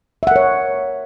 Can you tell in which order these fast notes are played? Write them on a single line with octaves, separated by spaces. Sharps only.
E5 F#5 A#4 C#5